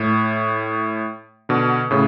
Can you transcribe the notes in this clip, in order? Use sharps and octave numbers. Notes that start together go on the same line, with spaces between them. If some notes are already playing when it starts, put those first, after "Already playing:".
Already playing: A2
B2 D3
A2 C#3